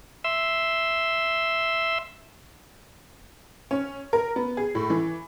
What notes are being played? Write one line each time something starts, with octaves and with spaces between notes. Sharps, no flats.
E5 C6 E6
C#4
A#4
B3
G#4
A2
E3